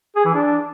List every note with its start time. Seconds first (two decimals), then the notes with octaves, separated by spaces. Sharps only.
0.16 G#4
0.25 E3
0.34 D4